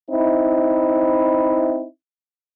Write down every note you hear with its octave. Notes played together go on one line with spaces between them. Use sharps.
C4 D#4 E4